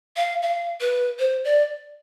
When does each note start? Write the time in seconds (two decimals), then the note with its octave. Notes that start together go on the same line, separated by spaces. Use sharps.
0.16 F5
0.42 F5
0.81 B4
1.19 C5
1.44 D5